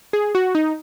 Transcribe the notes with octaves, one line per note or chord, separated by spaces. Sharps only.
G#4
F#4
D#4